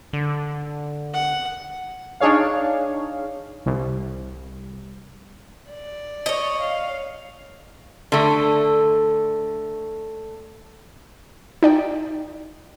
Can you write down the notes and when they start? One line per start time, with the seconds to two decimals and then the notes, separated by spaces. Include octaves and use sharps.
0.13 D3
1.14 F#5
2.20 D4 D#4 G#4 C#5 F5
3.66 C2
5.70 D5
6.26 C#5 D#5
6.61 F5
8.12 D3 A3
11.63 D#4 D5 G5